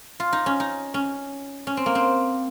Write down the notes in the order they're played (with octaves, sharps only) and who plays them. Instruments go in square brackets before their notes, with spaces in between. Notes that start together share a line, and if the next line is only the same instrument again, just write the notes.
[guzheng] F4
D#4
C#4
D#4
C#4
C#4
C4
A#3
C4